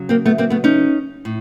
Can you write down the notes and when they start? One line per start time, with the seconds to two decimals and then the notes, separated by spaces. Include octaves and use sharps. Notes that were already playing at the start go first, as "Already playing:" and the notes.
Already playing: C#3 F#3
0.09 A#3 C4
0.26 A3 B3
0.38 A#3 C4
0.50 A3 B3
0.64 C#4 D#4
1.25 A2